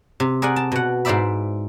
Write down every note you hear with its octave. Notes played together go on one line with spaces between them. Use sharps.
C3
G#4 A#4 D5 F#5 G#5
A5
B2 F#5
G#2 E4 C5 D5 E5 B5